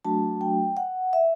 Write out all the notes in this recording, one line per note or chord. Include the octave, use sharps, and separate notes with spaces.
F#3 A3 D4 F#4 A5
G5
F#5
E5